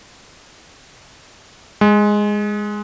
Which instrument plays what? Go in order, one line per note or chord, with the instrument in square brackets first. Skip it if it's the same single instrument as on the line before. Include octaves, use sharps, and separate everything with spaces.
[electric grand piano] G#3